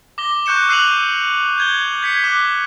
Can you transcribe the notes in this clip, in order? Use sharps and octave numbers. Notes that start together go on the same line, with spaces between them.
D6 A#6 G7
C#6 F#6 G6 C#7 E7
E6 F#6 C7 D#7 F7 F#7
G6 G#6 G7
G#6 B6 C#7
D6 F#6